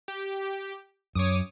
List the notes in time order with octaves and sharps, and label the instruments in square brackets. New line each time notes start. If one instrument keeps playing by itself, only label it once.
[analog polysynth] G4
[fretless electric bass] F#2 [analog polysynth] C#5 D6 D#6